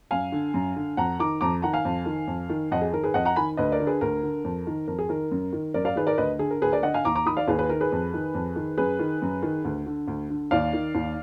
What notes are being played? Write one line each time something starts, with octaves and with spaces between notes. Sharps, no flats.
F#2 F5 G#5
D3
F#2
D3
F2 F#5 A#5
D#3 A#5 D6
F2 A#5 D6
D#3 F#5 A#5
F5 G#5
F2
D#3
F2
D#3
F2 D#5 F#5
G#4
D#3 A#4
G#4 B4
F2 D#5 F#5
F#5 A#5
D#3 G#5 B5
D2 B4 D#5
A#4 D5
D3
G#4 B4
D2 A#4
D3
F2
D#3
F2 A#4
G#4
D#3 A#4
F#2
D#3
F#2 A#4 D5
D5 F5
D#3 G#4 B4
A#4 D5
D2 B4 D#5
D3 G#4
A#4
D2 G#4 B4
A#4 D5
D3 D#5 F#5
F5 G#5
D#2 A#5 D6
A#5 D6
D#3 B5 D#6
D5 F5
D#2 G#4 B4
G#4 B4
D#3 A#4
G#4 B4
F2
D#3
F2
D#3
F#2 G#4 B4
D#3
F#2
D#3
D2
D3
D2
D3
D#2 D5 F5
D#3
D#2